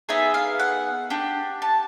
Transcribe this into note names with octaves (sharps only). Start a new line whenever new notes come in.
B3 D#4 G#4 E5
F5
F#5
D4 G4
A5